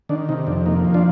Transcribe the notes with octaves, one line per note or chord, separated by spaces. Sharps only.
D#3 D4
C3 D#4
F2 D4
A#3 D#4
F3
D4 F4